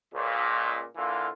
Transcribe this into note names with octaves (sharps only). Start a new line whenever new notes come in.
C#2 A#2
D3 E3 A#3 F4